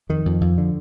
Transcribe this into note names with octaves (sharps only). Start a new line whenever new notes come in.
F2 D#3
F2
F2
D3